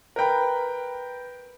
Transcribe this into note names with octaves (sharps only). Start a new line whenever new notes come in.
A#4 B4 G5 B5